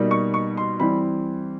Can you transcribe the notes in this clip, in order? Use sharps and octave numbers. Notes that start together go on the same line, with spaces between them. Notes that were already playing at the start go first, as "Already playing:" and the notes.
Already playing: B2 G3 A#3 D#4
C#6
C#6
C6
E3 G3 C4 B5